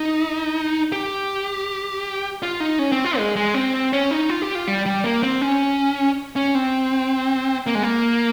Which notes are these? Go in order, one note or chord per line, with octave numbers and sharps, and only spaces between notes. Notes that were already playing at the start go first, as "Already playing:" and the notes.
Already playing: D#4
G4
F4
D#4
C#4
C4
F4
G#3
G#3
C4
C#4
D#4
F4
G4
F4
G3
G3
A#3
C4
C#4
C#4
C4
A#3
G#3
A#3